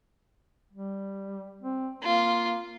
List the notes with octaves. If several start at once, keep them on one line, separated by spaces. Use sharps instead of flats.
G3
C4
A#3 F4